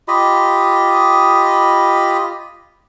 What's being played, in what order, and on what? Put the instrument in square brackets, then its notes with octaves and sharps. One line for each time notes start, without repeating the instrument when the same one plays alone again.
[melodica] F4 G4 D#5 B5